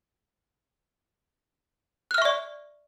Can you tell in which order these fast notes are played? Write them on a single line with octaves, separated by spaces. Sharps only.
F#6 F6 E5 C#6 D5